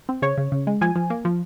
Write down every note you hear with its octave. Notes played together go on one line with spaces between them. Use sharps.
C4
C#3 C#5
C#3
C#3
G#3
F3 G#5
F3
A#3
F3